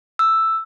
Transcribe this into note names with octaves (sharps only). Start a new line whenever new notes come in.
E6